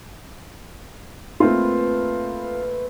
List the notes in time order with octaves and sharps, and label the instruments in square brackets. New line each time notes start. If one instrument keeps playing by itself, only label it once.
[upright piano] A3 A#3 C4 [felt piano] F4 [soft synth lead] B4